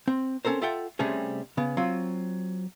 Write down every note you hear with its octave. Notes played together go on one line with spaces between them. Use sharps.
C4
C4 C#4 A4 A#4 C5
F4 A4 E5 F#5 G5
C3 G3 A3 C4 C#4 G#4
C#3 B3
F#3 C4 F4